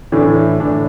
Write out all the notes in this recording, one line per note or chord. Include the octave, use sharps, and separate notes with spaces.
A2 E3 A3 D4
A2 E3 D4